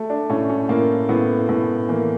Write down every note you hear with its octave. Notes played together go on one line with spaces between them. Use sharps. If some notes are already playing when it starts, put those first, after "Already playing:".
Already playing: A3
D4
A2 C#4
C#4
A2 A#3
A2 B3
A2 B3
E3 A#3